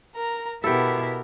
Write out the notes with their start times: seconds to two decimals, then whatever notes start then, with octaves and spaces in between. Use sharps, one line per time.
0.15 A#4 A#5
0.64 B2 B3 E4 G4 A4 A#4